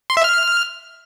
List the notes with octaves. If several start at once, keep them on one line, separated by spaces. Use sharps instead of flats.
C6
E5
F6